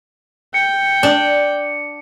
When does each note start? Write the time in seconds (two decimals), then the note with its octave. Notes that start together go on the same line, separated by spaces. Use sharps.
0.54 G5 C#7
1.03 D4